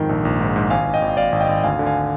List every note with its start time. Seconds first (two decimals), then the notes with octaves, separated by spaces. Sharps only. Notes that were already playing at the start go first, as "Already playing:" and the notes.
Already playing: F2 G#2 D#3 G5
0.09 A#1
0.25 A#1
0.40 G#2
0.56 G#2
0.70 G#1 F5 G#5
0.87 G#1
0.94 D#5 G5
1.02 G#1
1.17 G#1 D5 F5
1.32 G#1
1.40 D#5 G5
1.49 G#1
1.64 D2 F5 G#5
1.79 D3
1.86 F5 G#5